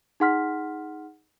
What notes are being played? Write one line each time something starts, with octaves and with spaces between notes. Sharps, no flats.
D#4 G#4 F#5 C6 F6 B6